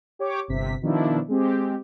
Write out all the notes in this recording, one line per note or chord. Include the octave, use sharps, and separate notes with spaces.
G4 C#5 D6
G1 C3 B6
B2 D#3 F3 D4 E4
G#3 C4 G4